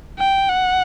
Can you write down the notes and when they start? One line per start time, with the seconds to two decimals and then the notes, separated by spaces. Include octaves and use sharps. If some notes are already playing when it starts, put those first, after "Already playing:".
0.19 G5
0.48 F#5